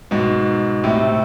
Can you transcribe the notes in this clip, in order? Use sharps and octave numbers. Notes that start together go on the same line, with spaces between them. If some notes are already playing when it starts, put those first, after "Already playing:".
G#2 B2
A2 C3